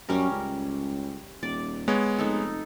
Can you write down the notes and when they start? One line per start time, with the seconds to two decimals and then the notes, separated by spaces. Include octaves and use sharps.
0.09 F#2 G3 C#4 A#4
0.30 C#2
1.43 D#1 D5
1.88 G#3 B3 C#5
2.18 F1 D#4 A4